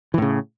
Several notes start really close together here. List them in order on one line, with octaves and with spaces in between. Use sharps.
E3 A2 C#3